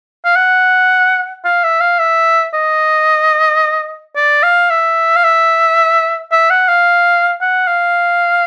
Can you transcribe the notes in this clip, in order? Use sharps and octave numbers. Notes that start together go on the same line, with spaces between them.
F5
F#5
F5
E5
F5
E5
D#5
D5
F5
E5
F5
E5
E5
F#5
F5
F#5
F5